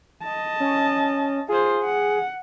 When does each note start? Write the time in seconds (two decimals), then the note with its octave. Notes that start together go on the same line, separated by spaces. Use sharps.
0.23 D#5 A5
0.60 C#4
1.49 F4 G#4 C5
1.84 F#5